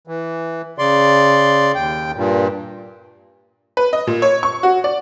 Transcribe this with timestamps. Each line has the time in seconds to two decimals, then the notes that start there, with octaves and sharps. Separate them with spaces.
0.07 E3
0.78 C#3 D5 C6
1.75 D#2 G5
2.16 G2 A#2
3.77 B4
3.93 D#5
4.07 A#2
4.22 C#5
4.43 C#6
4.63 F#4
4.84 D5